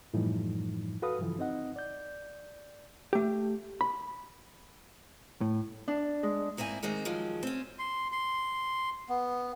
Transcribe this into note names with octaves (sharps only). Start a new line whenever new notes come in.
F#2 A2 E3 F3 G3 D#4
F#4 A4 B4 F5 D#6
G2 C#3 E3 F3
C4 D#4 D#5 F#5
D5 G6
A3 G4
B5
A2
D4
G#3
G#2 A#3 C4 E4 G#5
D#3 G#3 A#3 C4 D#4
D#3 F3 F#3 G#3
C4 C#4
C6
C6
B3